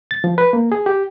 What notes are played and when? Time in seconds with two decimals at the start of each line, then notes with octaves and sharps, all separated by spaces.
0.11 A6
0.24 F3
0.38 B4
0.53 A#3
0.72 G#4
0.86 G4